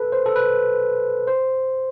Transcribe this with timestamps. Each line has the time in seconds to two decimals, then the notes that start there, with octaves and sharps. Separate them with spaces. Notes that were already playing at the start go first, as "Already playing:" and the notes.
Already playing: A4 B4
0.12 C5
0.26 A4
0.36 B4
1.27 C5